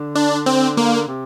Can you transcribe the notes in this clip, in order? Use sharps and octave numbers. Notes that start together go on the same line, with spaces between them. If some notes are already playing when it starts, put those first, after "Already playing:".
Already playing: D3
D4
C4
A#3
C3